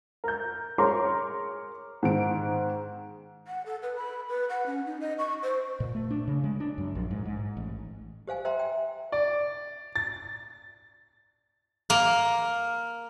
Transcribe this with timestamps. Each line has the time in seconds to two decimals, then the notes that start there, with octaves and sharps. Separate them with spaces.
0.24 A#4 G6
0.78 G#4 A#4 C#5 A#5 C6 D6
2.03 G#2 D#3 D7
3.47 F#5
3.66 A4
3.83 B4
3.96 B5
4.28 B4
4.49 F#5
4.66 C#4
4.86 D#4
5.01 D#5
5.19 C#6
5.43 C5
5.80 A#2
5.95 A3
6.10 D4
6.28 C#3
6.44 G#3
6.60 D4
6.78 F#2
6.95 A#1
7.11 G#2
7.25 G#2
7.57 A1
8.27 G4 C5 F5 G#5
8.45 C5 E5 G5 A#5 C6
8.60 G5
9.12 D5
9.96 A6
11.90 A#3